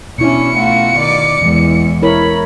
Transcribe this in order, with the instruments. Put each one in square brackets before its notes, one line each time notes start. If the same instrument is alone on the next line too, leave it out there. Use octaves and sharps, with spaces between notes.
[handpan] B2 E4 [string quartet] C#4 D4 [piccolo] C#7
[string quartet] A3 F4 F#4
D#3 D5 D6
[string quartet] E2 [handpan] E3 G#3
[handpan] E4 A#4 C#5 [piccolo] B5